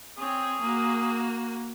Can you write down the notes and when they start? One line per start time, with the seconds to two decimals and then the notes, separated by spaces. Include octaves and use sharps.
0.18 C4 G#4 C#5
0.62 A#3 F#4